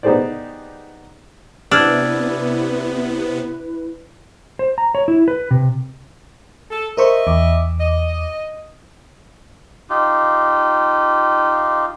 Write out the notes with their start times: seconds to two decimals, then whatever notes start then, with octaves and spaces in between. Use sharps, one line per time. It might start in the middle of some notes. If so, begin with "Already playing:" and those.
0.03 B3 D#4 G4 G#4 C5 D5
1.71 C3 B3 D4 E4 B4 E6 F6 G#6
4.59 C5
4.78 A#5
4.95 C#5
5.08 E4
5.28 B4
5.51 C3
6.70 A4
6.97 A#4 C5 D#5 E5 C#6
7.27 E2 D6
7.80 D#5
9.90 D#4 F4 G4